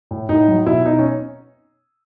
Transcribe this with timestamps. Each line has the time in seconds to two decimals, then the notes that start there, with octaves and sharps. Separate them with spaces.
0.11 A2
0.29 A2 D#4
0.48 F#3
0.66 B2 E4
0.85 B2 D#4
0.99 C#4